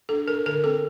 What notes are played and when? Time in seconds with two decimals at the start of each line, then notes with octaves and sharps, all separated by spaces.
0.09 D4 A4
0.28 D4 A#4
0.46 D3 A#4
0.64 C4 A4